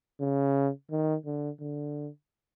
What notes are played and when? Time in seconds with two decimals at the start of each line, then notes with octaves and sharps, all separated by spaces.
0.21 C#3
0.91 D#3
1.26 D3
1.60 D3